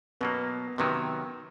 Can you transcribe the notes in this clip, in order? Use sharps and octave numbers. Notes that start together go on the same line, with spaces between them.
B2 F#3 A#3 B3
C3 D#3 F#3 B3